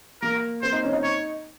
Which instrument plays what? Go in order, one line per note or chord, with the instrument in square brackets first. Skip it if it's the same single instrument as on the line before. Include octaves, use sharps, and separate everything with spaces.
[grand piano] A#3 [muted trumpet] A#4
[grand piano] C4 [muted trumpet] C5
[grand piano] D#4
C#4
D#4
[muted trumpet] C#5